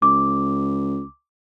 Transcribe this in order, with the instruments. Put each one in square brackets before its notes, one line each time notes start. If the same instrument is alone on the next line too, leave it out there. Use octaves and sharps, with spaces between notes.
[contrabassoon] C#2 [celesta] D6